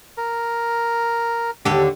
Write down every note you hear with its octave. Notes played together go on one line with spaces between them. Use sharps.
A#4
D#2 D3 G4 A4